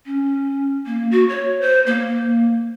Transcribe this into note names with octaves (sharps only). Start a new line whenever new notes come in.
C#4
A#3
F#4
C#5
C5
A#3